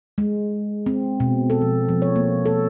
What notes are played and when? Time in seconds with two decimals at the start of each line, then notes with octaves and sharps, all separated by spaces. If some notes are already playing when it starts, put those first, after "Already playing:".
0.18 G#3
0.86 C4
1.20 B2
1.50 A4
1.61 F3
1.89 F3
2.02 C#5
2.16 A#3
2.46 A4